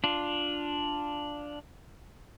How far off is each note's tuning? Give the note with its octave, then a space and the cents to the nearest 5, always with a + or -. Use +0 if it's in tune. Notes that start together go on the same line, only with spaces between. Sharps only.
D4 +0 F4 +0